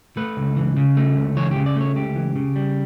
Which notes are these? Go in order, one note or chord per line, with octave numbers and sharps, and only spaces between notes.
A3 B4
C#2
E3
C#3
A3
C#2
E3 C#5
C#3 G4
D5
A3
C#5
C#2 G4
E3
C#3
G3